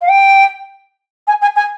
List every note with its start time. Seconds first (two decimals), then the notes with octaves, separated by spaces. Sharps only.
0.02 F5
0.09 G5
1.27 G#5
1.42 G#5
1.56 G#5